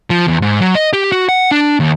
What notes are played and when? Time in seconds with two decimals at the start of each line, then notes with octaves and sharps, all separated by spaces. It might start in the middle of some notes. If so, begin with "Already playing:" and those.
0.10 F3
0.27 E2
0.42 G#2
0.61 F#3
0.75 D#5
0.93 G4
1.12 F#4
1.29 F#5
1.51 D4
1.80 D#2